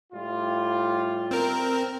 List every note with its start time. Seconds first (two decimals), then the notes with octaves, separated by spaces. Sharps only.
0.13 A2 G3 F4
1.31 C4 A#4